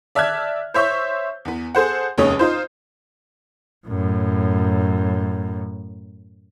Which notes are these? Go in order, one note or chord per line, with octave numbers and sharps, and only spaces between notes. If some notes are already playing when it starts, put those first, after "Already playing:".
D5 E5 A5 F6 F#6 G#6
C5 C#5 E5 C#6 G6
E2 B3
G#4 A4 C5 F#5
F1 D#2 G#3 C#4 C#5 D#6
D#4 F4 C5
F#2 A2